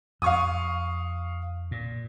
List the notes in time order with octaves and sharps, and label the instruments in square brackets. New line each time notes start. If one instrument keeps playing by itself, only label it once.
[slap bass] F2 [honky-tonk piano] F5 C#6 D#6
[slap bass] A#2